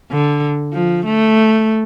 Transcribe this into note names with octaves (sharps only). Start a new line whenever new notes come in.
D3
F3
A3